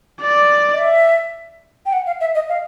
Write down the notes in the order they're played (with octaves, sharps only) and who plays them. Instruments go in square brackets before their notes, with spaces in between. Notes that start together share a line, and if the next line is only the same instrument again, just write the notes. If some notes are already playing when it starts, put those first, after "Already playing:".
[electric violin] D5
[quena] D#5
E5
G5
F#5
F5
E5
D#5
F5